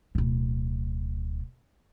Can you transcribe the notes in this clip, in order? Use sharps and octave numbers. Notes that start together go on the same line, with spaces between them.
D1 B2